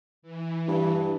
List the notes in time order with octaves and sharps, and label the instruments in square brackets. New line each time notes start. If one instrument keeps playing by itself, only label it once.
[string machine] E3
[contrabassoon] G2